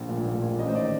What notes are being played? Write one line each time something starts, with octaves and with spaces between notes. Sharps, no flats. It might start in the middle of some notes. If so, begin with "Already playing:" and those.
Already playing: A#1
A#2
A#1
A#2
A1 D#5
C5
D#3 D5